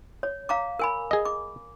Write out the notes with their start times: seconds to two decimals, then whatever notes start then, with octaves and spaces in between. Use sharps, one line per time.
0.23 C#5
0.49 F5 A#5 D6
0.79 A#4 G#5 B5
1.11 G#4 D#5
1.25 D6